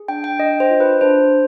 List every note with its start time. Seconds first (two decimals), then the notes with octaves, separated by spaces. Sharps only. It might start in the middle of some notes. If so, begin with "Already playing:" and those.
Already playing: G#4
0.08 D4 G5
0.24 G5
0.39 D4 D#5
0.60 C5
0.70 F4
0.80 B4
1.01 D4 C5